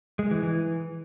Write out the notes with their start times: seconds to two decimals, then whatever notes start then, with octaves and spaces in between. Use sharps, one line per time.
0.19 G#3
0.31 E3
0.43 E3